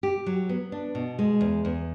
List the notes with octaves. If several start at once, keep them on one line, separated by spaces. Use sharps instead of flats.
G4
F#3
B3
D4
B2
G#3
E2
E2